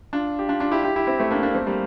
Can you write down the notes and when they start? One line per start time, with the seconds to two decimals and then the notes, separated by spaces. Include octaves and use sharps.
0.13 D4 F4
0.39 G4
0.48 D4 F4
0.60 D4 F4
0.71 E4 G4
0.84 E4 G4
0.96 E4 G4
1.07 C4 E4
1.19 A3 C4
1.31 A#3 D4
1.43 A#3 D4
1.55 A3 C4
1.67 G3 A#3